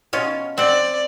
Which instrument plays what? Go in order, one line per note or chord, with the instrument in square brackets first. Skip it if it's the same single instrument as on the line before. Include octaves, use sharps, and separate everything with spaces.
[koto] B2 C#4 F4
[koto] C4 F#5 [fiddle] D5